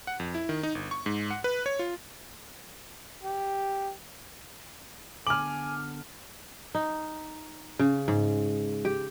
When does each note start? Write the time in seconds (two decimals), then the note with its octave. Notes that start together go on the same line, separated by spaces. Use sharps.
0.07 F#5
0.20 F2
0.34 E4
0.49 D#3
0.63 D#4
0.75 G1
0.91 C#6
1.06 G#2
1.30 F#5
1.44 B4
1.66 C#5
1.79 F4
3.24 G4
5.27 D3 B3 D4 G#5 D6 F6 F#7
6.75 D#4
7.79 C#3
8.08 G#2
8.85 G4